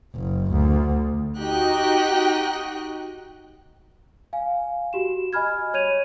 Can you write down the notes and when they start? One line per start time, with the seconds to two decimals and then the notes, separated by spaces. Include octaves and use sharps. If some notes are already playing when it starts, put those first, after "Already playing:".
0.15 F#1
0.52 D2
1.39 D#4 F#4 G4 G5 F#6
4.33 F5 G#5
4.93 F#4 G4 E7
5.33 D#5 G#5 B5 F6 G#6
5.74 C#5 G#6 D#7 F7